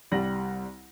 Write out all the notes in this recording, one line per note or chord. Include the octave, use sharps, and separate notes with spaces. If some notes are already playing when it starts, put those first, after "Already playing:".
C2 G3 A#6 F#7